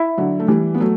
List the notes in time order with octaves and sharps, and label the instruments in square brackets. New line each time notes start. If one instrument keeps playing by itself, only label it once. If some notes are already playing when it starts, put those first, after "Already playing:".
Already playing: [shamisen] E4
[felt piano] D3 F#3
A3
E3 G3
B3
F#3 A3